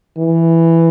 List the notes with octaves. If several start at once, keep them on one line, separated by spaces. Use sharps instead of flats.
E3